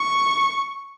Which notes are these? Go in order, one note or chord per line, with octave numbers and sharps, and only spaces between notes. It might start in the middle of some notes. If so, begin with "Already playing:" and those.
Already playing: C#6